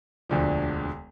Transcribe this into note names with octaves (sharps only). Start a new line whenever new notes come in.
E1 D2 D3 F3